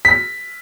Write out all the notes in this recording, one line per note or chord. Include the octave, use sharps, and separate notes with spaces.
B6